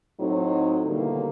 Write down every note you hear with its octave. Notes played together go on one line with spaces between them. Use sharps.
A2 F#3 C4 D#4
B2 D3 D#3 G3 A#3 E4